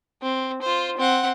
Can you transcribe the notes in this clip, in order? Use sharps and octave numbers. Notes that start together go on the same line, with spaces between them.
C4
F4 C5
C4 F#5